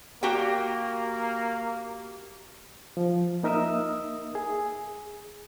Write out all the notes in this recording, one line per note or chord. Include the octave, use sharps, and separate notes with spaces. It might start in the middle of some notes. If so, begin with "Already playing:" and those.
A#3 F#4 G4 G5
F3
A#3 D#4 A#4 E5 D#6 E6
G#4